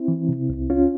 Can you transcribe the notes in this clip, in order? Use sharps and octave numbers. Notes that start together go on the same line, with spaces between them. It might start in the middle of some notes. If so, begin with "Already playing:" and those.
Already playing: C4 E4
E3
C3
C2
C#2 C#4 F4